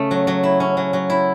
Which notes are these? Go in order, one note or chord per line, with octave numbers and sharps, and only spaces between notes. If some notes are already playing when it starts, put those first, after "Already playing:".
Already playing: C#3 A3
F#3
F#3
E4
C#4
F#3
F#3
E4